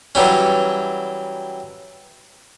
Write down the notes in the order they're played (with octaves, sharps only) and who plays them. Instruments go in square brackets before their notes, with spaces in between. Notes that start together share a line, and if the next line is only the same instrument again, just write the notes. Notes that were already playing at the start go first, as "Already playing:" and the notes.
[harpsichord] E3 F#3 G3 C#4